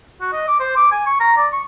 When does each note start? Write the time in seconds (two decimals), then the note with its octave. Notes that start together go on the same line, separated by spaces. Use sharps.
0.21 F#4
0.33 D#5
0.48 D6
0.60 C5
0.76 D6
0.91 G#5
1.06 C#6
1.20 A#5
1.37 D5
1.52 C#6